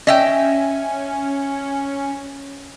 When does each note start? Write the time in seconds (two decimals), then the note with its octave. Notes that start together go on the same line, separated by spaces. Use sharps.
0.07 C#4 D#5 E5 G5